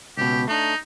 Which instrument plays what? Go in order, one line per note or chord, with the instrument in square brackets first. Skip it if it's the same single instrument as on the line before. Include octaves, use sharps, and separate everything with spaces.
[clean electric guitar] C#2 B2 [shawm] G4
[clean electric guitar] A3 D4 [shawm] D#4